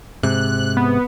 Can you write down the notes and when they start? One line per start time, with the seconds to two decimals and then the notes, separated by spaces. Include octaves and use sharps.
0.23 G#2 C3 F#6
0.77 B3